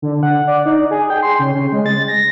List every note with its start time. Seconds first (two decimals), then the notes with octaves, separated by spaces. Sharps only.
0.02 D3
0.23 F#5
0.47 D5
0.66 D#4
0.91 G#4
1.10 G5
1.23 C6
1.39 C#3
1.54 C#3
1.72 G#3
1.86 A6
2.08 A#6